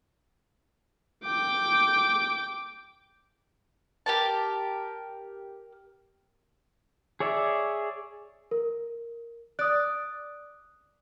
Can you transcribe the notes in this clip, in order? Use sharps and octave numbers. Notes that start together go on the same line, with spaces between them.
G5 D6
G4 A#4 A5
G#4 C#5 D5 E5
A#4
D5 D#6 F#6